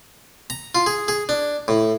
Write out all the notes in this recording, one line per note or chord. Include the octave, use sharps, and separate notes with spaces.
A#5
F4
G#4
G#4
D4
A2